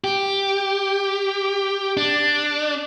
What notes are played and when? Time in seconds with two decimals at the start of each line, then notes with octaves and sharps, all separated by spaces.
0.04 G4
1.97 D4